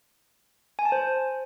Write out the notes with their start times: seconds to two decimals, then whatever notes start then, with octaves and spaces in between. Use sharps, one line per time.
0.79 G#5
0.85 A5
0.92 C5